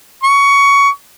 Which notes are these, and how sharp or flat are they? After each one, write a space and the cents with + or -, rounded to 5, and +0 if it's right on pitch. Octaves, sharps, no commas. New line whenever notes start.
C#6 +15